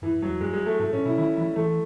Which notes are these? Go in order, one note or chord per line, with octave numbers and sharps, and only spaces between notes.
F#2 E3
F#2
F#3
E2
F#2 G#3
G#3
A3
G#2 A3
A2 C#4
B2 E4
D#3 E4
E3 E4
E3 A3